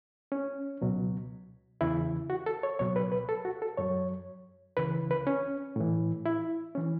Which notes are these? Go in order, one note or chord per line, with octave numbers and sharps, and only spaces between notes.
C#4
C#2 B2 F#3
E2 C#3 E3 E4
F#4
A4
C#5
C#2 B2 F#3 C#5
B4
B4
A4
F#4
A4
F#2 F#3 C#5
C#2 C#3 E3 B4
B4
C#4
A2 E3
E4
E3 C#4